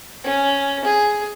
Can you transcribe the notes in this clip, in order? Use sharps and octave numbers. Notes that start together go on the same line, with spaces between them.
C#4
G#4